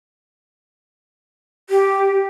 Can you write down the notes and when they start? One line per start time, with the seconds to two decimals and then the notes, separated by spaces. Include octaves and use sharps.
1.70 G4